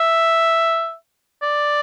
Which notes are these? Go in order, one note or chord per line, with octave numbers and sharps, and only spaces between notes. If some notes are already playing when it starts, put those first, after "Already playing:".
Already playing: E5
D5